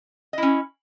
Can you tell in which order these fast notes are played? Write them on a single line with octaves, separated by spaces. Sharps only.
D#5 E4 C#4